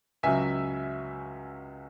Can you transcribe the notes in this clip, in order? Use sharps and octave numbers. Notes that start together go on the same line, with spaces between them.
C#2 C#3 F#3 E5 G#5